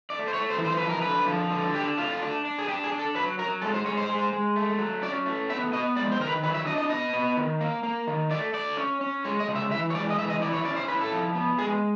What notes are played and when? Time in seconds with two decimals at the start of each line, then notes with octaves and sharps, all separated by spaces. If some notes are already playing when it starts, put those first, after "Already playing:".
0.10 A3 D5
0.28 C5
0.34 A3 C#5
0.50 C5
0.58 E3
0.65 C5
0.77 F3 B4
0.89 A#4
1.02 D3 B4
1.28 F3
1.51 D3
1.74 D4 G4
1.98 A3 F4
2.22 D4
2.45 D4
2.59 G#4
2.68 D4 G4
2.84 G#4
2.92 D4
2.99 A4
3.15 F#3 B4
3.39 F#3 A#4
3.62 G#3 A4
3.74 C5
3.86 G#3 C#5
3.97 C5
4.09 G#3
4.33 G#3
4.56 A3
4.79 F#3
5.03 C#4 D5
5.26 A3
5.49 B3 E5
5.73 B3 D#5
5.96 G#3 D5
6.12 C5
6.20 D#3 A#4
6.27 B4
6.43 F#3 B4
6.54 E5
6.66 D4 D#5
6.78 D#5
6.90 B3 D#5
7.13 B3
7.37 D#3
7.61 A#3
7.83 A#3
8.07 D#3
8.31 A3 D5
8.54 A3 D5
8.77 C#4
9.01 C#4
9.25 G#3 C#5
9.40 D#5
9.48 C#3
9.56 E5
9.71 E3 E5
9.90 C#5
9.95 G#3 D5
10.10 D#5
10.18 E3 E5
10.30 D#5
10.42 E4 D5
10.53 C#5
10.65 C#4 D5
10.76 C5
10.88 E4 B4
11.01 A4
11.11 F3
11.35 B3
11.58 G#3 G#4